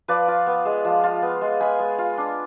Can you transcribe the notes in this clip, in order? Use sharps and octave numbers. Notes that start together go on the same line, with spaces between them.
F3 B4 D5
F4
B3
G#3
F3
F4
B3
G#3
G#3 G#5 B5
G#3
F4
D4